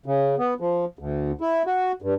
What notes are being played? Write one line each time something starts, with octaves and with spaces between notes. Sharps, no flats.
C#3
B3
F3
D2
E4
F#4
G2